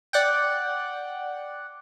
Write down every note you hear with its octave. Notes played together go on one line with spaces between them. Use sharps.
D5 F#5 G5